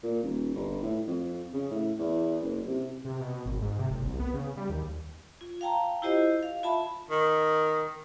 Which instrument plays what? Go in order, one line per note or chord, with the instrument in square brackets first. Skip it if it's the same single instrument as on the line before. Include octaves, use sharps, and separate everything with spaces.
[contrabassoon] A#2
D#1
G1
A2
F2
C#3
A2
E2
F#1
C3
[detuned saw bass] C3
B2
B2
G#1
G#2
C3
F#1
C2
B3
C#3
G3
D#2
[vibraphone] F4
F5 G5 A5 A#5
E4 F4 G4 C5 D#5
F5
F4 E5 A5 B5
[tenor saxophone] D#3